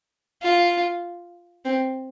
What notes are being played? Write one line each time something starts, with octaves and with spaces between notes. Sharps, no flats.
F4
C4